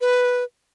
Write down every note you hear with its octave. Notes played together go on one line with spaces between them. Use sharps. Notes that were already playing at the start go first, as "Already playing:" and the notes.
B4